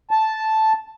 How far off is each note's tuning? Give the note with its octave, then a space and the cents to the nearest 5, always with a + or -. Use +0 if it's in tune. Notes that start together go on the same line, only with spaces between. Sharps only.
A5 -5